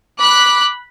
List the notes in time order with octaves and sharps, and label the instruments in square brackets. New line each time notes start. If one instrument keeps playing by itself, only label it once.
[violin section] B5 F#6 [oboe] D6